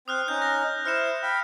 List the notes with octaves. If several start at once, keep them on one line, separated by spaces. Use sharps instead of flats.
C4 C5 D#6 F6 F#6
C#4 D#4 D#5 G6
A#6
E4 C5 F6 C#7 E7
F5 G5 B5